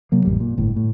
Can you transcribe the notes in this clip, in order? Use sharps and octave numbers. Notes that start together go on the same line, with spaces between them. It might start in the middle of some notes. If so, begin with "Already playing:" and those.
C3 F#3 A#3
A1 F2 G3
A#2
G1 A2
A2